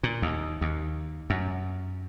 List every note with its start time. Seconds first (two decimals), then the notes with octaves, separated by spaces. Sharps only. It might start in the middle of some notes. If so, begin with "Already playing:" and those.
0.03 A#2
0.22 D#2
0.61 D#2
1.30 F#2